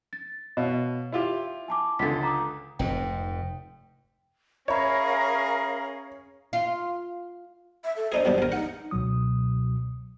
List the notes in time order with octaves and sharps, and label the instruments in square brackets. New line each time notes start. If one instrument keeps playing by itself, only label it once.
[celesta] A6
[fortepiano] B2 [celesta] C#5 F5
[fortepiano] E4 F4 G4
[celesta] G#5 A5 D6
[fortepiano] C#2 D3 [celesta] A6 B6
[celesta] A#5 D6 D#6
[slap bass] F1 G#2 [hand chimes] G5
[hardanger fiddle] C#4 G#4 [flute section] A#4 F5 A#5 [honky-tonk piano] C#5 [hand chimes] E5 B5
[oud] F4
[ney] E5
A4
[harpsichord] D4 D#4 G#4 [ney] C5
[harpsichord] B2 G3 D4
A#1 A#4
[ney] D#4 [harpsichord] F#5
[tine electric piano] C#2 B2 F#3 D#6